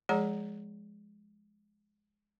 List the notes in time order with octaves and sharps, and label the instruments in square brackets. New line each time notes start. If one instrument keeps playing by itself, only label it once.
[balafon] F3 G#3 G#4 C#5 A#5